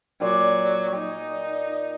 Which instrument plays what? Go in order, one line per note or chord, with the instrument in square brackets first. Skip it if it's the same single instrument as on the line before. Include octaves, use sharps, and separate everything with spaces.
[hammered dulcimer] A#2 D5 C6 [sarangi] F#3
[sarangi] D#4